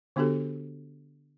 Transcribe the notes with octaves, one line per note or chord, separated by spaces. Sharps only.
D3 B3 D4 F#4 G4 A4